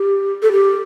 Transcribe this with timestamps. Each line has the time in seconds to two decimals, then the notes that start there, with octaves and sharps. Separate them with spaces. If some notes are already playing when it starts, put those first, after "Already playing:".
Already playing: G4
0.42 A4
0.52 G4